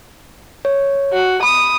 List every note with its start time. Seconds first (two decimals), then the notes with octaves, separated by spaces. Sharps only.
0.65 C#5
1.13 F#4
1.43 B5 D#6